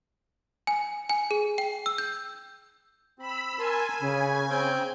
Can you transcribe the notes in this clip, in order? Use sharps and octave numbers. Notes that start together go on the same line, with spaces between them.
G#5
G#5
G#4
G5
E6
G6
C4 B5 E6
A#4 G#5 A5 C6 E6
C#3 B5
C4 G5